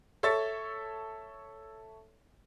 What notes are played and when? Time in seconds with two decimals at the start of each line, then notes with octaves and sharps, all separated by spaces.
0.23 A4 C#5 E5 C#6 A6